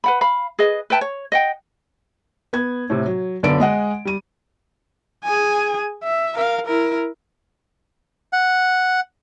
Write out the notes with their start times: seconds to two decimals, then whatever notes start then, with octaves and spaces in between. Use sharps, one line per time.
0.04 B4 F#5 B5
0.21 F5 B5
0.59 G#4 B4 D#5
0.90 B4 E5 G5 A5
1.01 C#5
1.32 D#5 F#5 G5
2.53 B3 G#6
2.90 A2 C3
3.06 F#3
3.43 B1 F#2 D3 B3 D5 D7
3.60 G#3 D#5 F#5
4.05 G3 D#7
5.24 G#4 G#5
6.03 E5
6.35 A#4 F5
6.66 E4 A#4
8.33 F#5